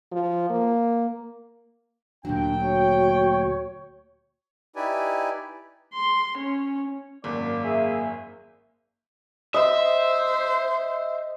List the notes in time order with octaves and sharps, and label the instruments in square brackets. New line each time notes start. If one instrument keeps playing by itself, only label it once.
[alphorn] F3
A#3
[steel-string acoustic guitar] D2 A#2 F#3 [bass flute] D4 [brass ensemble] G5
[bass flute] F#4 [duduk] C#5
[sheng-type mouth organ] D#4 E4 G4 B4 D5 G#5
[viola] C6
C#4
[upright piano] G#1 F#2 [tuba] A#3 [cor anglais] D5
[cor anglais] G#4 [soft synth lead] E5
[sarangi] C5 [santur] D#5 [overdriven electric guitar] E5